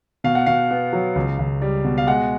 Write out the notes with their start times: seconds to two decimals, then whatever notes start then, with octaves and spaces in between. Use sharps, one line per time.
0.24 B2 F5
0.35 F#5
0.46 B2 F5
0.71 B3
0.93 F#3
1.15 C#2
1.39 C#2
1.62 G3
1.84 B2
1.98 F5
2.07 G#3 F#5